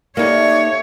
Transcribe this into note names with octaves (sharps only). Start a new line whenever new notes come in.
A#3 D#4 G4 A4 C#5 D5 E5